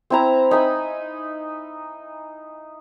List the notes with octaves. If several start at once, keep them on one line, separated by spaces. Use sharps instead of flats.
C4 E4 A#5
D#4 E5 G#5 B5